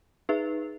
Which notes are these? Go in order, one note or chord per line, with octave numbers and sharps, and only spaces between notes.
D#4 G#4 B4 E5